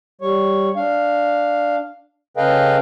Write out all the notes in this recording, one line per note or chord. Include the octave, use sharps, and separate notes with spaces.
G3 C#5
D4 F5
C#3 A4 B4 D#5 F5 G5